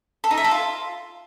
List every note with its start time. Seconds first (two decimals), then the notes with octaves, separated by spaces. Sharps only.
0.24 A4
0.31 D#4
0.38 E5
0.44 A4
0.51 F4